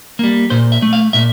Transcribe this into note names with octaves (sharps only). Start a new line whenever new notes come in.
G3 A#3
A#2 C5
E5
A3
F5
A#2 E5